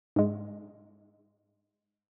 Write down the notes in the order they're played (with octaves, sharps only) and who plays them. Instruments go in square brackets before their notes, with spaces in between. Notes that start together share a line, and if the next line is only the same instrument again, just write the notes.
[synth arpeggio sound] G#2 G#3